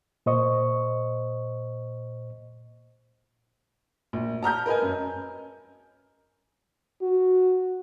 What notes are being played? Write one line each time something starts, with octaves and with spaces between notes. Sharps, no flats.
A#2 C5 D#5 C#6
A#1
A5 A#5 F6 G6
A#4 B4 D#5 G#5
F#2
F#4